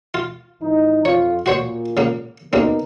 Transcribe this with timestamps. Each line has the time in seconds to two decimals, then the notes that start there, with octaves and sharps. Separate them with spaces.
0.14 F4
0.61 G#1 E3 D#4
1.05 F2 F4 C#5
1.46 A#2 F#4 C5 C#5
1.97 C#3 A#3
2.53 D2 C#3 A#3 B3 D#4 A#4